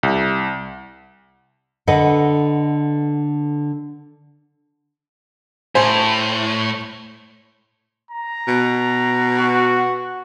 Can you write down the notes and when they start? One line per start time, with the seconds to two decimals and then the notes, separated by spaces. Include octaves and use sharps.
0.03 C2
1.87 D3 A4 B4 D#5 F#5
5.75 A2 C5 G#5
8.11 A#5
8.48 B2
9.39 F#4